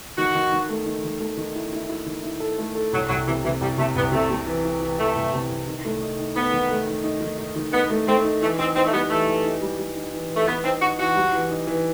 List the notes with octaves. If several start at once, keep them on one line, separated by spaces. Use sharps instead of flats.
D#3 F#4
D#3
D#3
A3
D#3
D#3
A3
D#3
E4
E4
E4
D#3
E4
A4
A3
A4
C2 F#3
C2 F#3
C3 E3
C3 E3
C2 G3
C3 A3
C2 B3
C3 A3
C3
E3
E3
E3
E3 A3
C2
C3
C2
D#3
A3
D#4
D#4
B3 D#4
D#3
A3
D#3
D#4
D#3
D#4
D#3
B3 D#4
A3
A3 C4
D#4
E3 A3
C4 D#4
C4 D#4
A3
G3 B3
E3 A3
E3
D#4
G3
G3
D#4
E3
E3
A3
E3 B3
C4 D#4
D#4 F#4
E3 F#4
G3
E3
D#4
E3